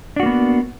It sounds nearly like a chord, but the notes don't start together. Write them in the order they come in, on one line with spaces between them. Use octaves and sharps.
D4 F#4 A#3 B3